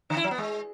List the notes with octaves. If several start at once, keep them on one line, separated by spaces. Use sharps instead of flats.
D3
E4
F#3
B3
G#3